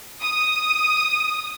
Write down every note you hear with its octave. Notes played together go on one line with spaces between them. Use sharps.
D#6